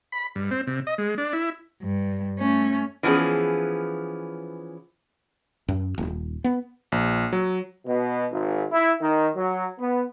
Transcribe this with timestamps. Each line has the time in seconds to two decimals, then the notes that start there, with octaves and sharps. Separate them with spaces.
0.12 B5
0.35 G2
0.51 C4
0.67 C3
0.87 D#5
0.98 G#3
1.18 D4
1.33 E4
1.82 G2
2.39 A3 C#4
3.03 E3 F3 B3 C#4 G#4
5.68 F#2
5.98 D#1
6.44 B3
6.92 A#1
7.33 F#3
7.86 B2
8.31 G#1
8.71 E4
9.00 D#3
9.36 F#3
9.79 B3